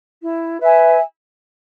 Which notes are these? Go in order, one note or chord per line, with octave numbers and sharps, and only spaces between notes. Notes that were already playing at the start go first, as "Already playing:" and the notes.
E4
B4 E5 G#5